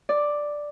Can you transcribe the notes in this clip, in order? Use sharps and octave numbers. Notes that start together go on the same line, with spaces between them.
D5